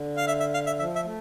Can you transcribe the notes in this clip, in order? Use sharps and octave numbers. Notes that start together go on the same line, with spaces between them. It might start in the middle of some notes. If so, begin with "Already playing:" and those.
Already playing: D3
F5
E5
E5
F5
E5
F3 E5
E5
A3